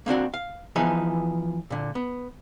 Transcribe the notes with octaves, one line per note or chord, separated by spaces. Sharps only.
A#3 C4 D4 F#4
F5
E3 F3 B3 D#4 G#4
A#2 D3
B3